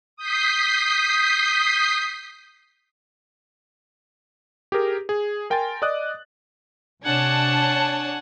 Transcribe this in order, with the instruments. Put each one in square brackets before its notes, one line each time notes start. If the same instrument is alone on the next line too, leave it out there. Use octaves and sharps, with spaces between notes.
[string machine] D#6 G6 B6 C7
[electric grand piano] G4 G#4 A#4
G#4
A#4 G5 G#5 C6 A6
D5 D#5 D6 D#6 F#6
[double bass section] C3 [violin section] D4 C#5 A5 [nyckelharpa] F#5 G#5